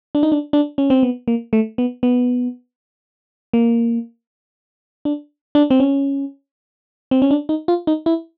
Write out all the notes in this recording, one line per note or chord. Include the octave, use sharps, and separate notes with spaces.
D4
D#4
D4
D4
C#4
C4
B3
A#3
A3
B3
B3
A#3
D4
D4
C4
C#4
C4
C#4
D4
D#4
F4
D#4
E4